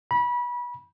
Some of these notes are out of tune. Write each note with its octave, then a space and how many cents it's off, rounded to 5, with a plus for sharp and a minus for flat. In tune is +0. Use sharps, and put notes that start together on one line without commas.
B5 -25